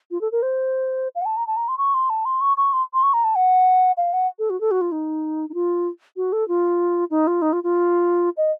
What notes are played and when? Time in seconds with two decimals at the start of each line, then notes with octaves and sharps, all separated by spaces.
0.11 F4
0.21 A4
0.32 A#4
0.42 C5
1.15 F5
1.21 F#5
1.25 A5
1.37 A#5
1.47 A5
1.57 A#5
1.68 C6
1.78 C#6
1.94 C6
2.10 A5
2.25 C6
2.41 C#6
2.57 C#6
2.73 C6
2.94 C6
3.03 C#6
3.13 A#5
3.24 A5
3.35 F#5
3.97 F5
4.13 F#5
4.39 A4
4.50 F#4
4.61 A4
4.71 F#4
4.81 F4
4.92 D#4
5.49 D#4
5.54 F4
6.16 F#4
6.32 A4
6.48 F4
7.11 D#4
7.27 F4
7.42 D#4
7.53 F4
7.64 F4
8.37 D#5